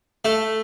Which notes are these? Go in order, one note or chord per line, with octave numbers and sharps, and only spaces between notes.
A3